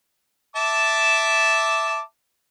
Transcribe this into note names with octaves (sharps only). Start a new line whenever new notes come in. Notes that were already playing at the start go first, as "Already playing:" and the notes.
E5 A5 D6